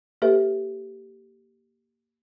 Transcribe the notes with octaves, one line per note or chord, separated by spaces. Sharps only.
A#3 G4 A4 B4 E5